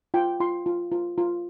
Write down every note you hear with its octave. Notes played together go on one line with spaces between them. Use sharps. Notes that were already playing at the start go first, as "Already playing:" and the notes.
F4 G5
F4 C6
F4
F4
F4